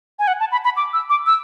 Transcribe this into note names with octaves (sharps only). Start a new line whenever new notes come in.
G#5
F#5
A5
B5
B5
D6
E6
D6
E6